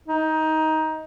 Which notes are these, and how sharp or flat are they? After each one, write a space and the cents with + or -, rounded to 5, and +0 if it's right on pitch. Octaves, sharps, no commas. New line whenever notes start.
D#4 +15